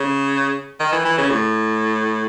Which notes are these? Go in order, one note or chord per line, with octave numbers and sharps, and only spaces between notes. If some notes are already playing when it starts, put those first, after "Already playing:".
Already playing: C#3
D#3
E3
E3
C#3
A2